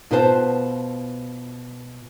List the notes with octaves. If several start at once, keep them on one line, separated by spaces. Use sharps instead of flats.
B2 F4 B4 C5 G#5 A5